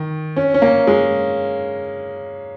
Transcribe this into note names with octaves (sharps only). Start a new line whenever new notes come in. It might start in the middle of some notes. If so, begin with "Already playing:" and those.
Already playing: D#3
C#4
C#4
A#3
G#3